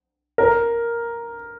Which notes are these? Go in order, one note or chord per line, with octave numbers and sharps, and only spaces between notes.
A#4